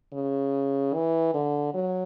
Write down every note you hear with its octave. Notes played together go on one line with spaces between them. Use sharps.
C#3
E3
D3
F#3